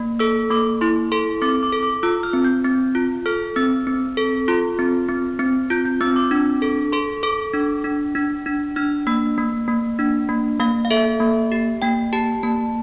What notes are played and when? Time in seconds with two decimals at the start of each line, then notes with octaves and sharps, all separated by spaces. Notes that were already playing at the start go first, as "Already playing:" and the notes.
Already playing: A#3
0.19 A4 E6
0.51 A#3 D6
0.81 E4 C6
1.12 A4 C6
1.42 C4 D6
1.63 D6
1.73 A4
1.83 D6
2.03 F4 E6
2.23 F6
2.33 C4
2.44 G6
2.65 C4
2.95 F4
3.26 A4 F6
3.56 C4 E6
3.87 C4
4.17 A4
4.48 F4 C6
4.79 C4
5.09 C4
5.39 C4
5.70 F4 G6
5.85 G6
6.01 C4 E6
6.16 D6
6.31 D4
6.62 A4
6.92 A4 C6
7.23 A4 D6
7.53 D4
7.84 D4
8.15 D4
8.46 D4
8.76 D4 F6
9.07 A#3 E6
9.38 A#3
9.68 A#3
9.99 D4
10.29 A#3
10.60 A#3 F5
10.85 F5
10.90 A4 E5
11.20 A#3
11.52 G4
11.82 A#3 G5
12.13 G4 A5
12.43 A#3 A5